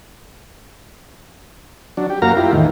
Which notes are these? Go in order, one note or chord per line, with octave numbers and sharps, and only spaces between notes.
F#3 D4
G4
F#2 A#3 F#4 A#4 F5 A#5
E4 F4 G4
E2 A2 D#3